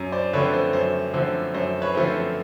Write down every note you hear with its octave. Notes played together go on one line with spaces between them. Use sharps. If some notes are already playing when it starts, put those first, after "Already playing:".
Already playing: F#2
C5 D5
D3 F3 A3 C4 B4 C#5
C5
F#2 C5
D3 F3 A3 C4 C5
F#2 C5
B4 C#5
D3 F3 A3 C4
C5